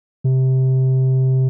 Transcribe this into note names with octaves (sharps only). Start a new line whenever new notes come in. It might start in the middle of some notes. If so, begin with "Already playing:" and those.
C3